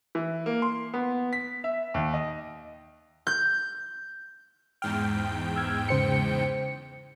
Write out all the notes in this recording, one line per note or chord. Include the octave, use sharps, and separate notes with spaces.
E3
A#3
C6
B3
B6
E5
D#2
D#5
G6
E2 G#2 G5 F6
E6 F6 G#6
C#3 C5 C#7